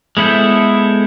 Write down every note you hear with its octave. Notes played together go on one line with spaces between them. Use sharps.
G#3 B3 E4 A4 C5